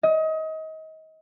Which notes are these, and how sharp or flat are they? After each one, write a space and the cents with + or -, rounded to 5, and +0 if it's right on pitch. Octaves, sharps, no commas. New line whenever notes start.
D#5 +30